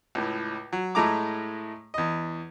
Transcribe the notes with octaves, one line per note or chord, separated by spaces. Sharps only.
C#2 A2
F#3
A2 G#3 A3 A#5 D6
E2 D#5